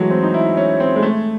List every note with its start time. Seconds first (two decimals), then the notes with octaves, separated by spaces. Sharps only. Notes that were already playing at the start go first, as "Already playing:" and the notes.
Already playing: E3 F#3 G#3 A3
0.11 C4
0.23 D#4
0.34 E4
0.57 C#4
0.80 C4
0.96 G#3
1.02 A3